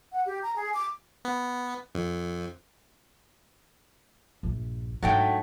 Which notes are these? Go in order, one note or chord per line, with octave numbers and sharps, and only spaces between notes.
F#5
G4
A#5
G#4
D6
B3
F2
A#1 G2
G#2 F#3 A3 D4 G5